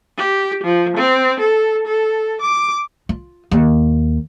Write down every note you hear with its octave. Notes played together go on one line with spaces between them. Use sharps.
G4
F3
C4
A4
A4
D6
F4
D#2